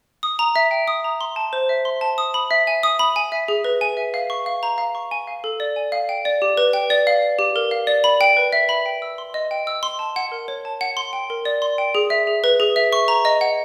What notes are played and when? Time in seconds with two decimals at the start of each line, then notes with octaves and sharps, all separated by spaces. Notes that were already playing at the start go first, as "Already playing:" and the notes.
0.23 D#6
0.39 A#5
0.56 E5
0.71 G5
0.88 D#6
1.04 A#5
1.21 C6
1.36 A5
1.53 C5
1.69 E5
1.85 C6
2.01 A5
2.18 D#6
2.34 B5
2.51 E5
2.67 G#5
2.83 D#6
2.99 B5
3.16 G#5
3.32 E5
3.48 G#4
3.64 B4
3.81 G#5
3.97 E5
4.14 F5
4.30 C#6
4.46 F5
4.63 A#5
4.78 F5
4.95 C#6
5.11 G#5
5.27 F5
5.44 A4
5.60 D5
5.76 G#5
5.92 F5
6.09 G5
6.25 D5
6.42 G4
6.57 B4
6.73 G5
6.90 D5
7.07 F5
7.22 D5
7.39 G4
7.56 A#4
7.71 F5
7.87 D5
8.04 B5
8.21 G5
8.37 B4
8.53 E5
8.69 B5
8.86 G5
9.02 E6
9.18 C6
9.34 D#5
9.51 G5
9.67 E6
9.83 C6
9.99 A5
10.16 F#5
10.32 A#4
10.48 C#5
10.65 A5
10.81 F#5
10.97 C6
11.13 G5
11.30 A#4
11.45 D5
11.62 C6
11.78 G5
11.95 G#4
12.10 E5
12.27 G#4
12.44 B4
12.60 G#4
12.76 E5
12.93 C#6
13.08 A#5
13.25 D#5
13.41 F#5